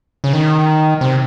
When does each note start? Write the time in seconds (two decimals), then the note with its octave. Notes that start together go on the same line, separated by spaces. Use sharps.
0.24 C#3
0.33 D#3
1.01 C3